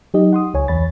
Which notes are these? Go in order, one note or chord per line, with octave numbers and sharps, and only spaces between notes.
F#3 D#4 G4 D#5
F#5 C6 D#6
C#2 C#5 G#5
E2 C#5 B5 A6